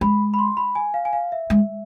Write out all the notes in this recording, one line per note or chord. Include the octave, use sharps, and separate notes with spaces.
G#3 B5
B5
C6
B5
G#5
F5
G#5
F5
E5
G#3